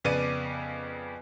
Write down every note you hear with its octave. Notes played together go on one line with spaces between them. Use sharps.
F2 C#3 B3 D5 D6 D#7